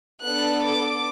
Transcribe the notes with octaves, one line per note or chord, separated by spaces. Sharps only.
B3 D4 A4 F#6
D6